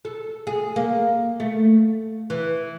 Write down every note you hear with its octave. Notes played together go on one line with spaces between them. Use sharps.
A4
G#4
A#3
A3
E3